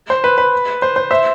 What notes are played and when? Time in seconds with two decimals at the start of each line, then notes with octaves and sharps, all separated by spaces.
0.10 C5
0.24 B4
0.38 B4
0.82 C5
0.96 C5
1.11 C5 E5